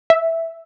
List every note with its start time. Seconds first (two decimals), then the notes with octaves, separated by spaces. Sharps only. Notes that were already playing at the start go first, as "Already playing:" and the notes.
0.10 E5